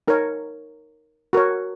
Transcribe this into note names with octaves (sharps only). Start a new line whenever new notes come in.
D#4 A#4 C#5
F#4 A#4 C#5